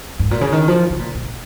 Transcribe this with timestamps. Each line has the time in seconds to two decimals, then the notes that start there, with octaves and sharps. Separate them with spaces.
0.19 G#2
0.31 A#2
0.41 C#3
0.52 D#3
0.68 F3
0.90 C#3
0.99 A#2
1.15 A#2